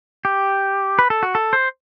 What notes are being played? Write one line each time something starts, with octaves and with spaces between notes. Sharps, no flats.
G4
B4
A4
F#4
A4
C5